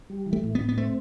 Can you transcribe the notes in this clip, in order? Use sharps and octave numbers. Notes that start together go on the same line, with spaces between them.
G3
E3
A3
A2
B3
A2
B3
A3 C4